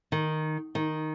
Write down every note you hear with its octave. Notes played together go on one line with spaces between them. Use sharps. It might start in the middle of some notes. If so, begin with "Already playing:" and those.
D#3
D#3